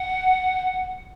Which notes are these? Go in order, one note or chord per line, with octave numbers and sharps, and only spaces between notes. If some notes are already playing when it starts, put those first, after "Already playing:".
Already playing: F#5